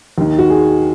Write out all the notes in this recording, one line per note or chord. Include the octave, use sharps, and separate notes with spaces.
D#2 D#3
F#4
G#4